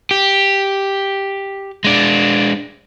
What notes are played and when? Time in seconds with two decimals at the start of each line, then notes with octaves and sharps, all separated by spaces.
0.11 G4
1.84 G#3 D4